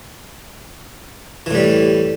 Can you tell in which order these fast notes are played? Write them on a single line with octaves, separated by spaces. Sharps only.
E3 A2 G3